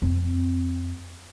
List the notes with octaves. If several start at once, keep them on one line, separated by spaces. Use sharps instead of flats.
F2 C4